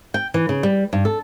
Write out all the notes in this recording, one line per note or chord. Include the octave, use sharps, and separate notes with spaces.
G5
E3
C#3
G3
G2
A4